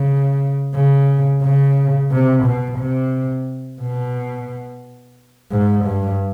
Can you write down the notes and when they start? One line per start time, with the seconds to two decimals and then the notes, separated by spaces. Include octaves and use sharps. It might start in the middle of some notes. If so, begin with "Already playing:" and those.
Already playing: C#3
0.74 C#3
1.42 C#3
2.11 C3
2.44 B2
2.79 C3
3.81 B2
5.51 G#2
5.85 G2